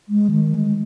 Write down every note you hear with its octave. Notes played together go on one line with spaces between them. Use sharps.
G#3
D#3
G#3